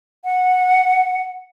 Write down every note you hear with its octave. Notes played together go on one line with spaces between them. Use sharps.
F#5